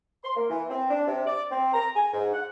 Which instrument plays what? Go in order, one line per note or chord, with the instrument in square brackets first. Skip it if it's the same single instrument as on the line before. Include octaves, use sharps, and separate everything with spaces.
[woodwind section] C6
A#3
E3
C4
D4
C3
D5
C4
A#5
G#5
G#2
F#5